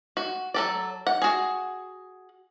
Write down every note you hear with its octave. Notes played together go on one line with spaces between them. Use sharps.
F#4
F#3 A4 D5
F#5
F#4 G#4